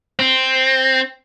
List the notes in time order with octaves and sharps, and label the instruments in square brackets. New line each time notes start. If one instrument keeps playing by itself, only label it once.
[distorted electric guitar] C4